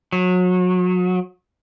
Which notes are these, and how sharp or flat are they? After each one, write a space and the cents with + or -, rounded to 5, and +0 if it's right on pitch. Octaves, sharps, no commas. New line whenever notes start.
F#3 -30